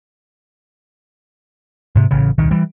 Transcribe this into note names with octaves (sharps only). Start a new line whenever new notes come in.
G#2 C3
A1 C#3
D#1 C2 D#3
E3 G3